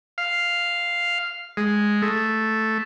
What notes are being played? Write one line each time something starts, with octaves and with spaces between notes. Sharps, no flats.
F5
G#3
A3